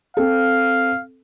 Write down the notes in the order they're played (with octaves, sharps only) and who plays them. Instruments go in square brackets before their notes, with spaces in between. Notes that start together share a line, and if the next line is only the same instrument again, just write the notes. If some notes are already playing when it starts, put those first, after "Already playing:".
[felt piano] C4 A4 [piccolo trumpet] F5